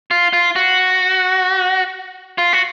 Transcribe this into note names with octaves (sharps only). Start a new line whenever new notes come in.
F4
F4
F#4
F4
F#4